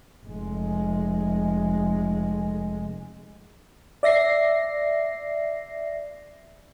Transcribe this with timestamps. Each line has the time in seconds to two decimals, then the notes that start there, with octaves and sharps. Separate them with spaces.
0.26 F1 G#3
4.03 D5 E5 A#6 C7